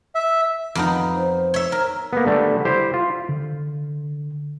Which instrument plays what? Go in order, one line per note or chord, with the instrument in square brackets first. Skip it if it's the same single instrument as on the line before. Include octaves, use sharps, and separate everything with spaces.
[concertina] E5
[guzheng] F2 B3 D#4
[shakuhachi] C5
[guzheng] C#5 E5
A#4
[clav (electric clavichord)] A#3 B3
D3 G3 A3
E4 G4 C5
F4
[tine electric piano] D3